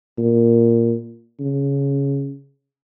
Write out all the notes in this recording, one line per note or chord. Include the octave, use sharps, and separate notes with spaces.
A#2
C#3